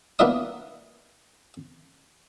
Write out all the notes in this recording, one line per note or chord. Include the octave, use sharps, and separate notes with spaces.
A#3 B3 D4 E4 D#5 D#6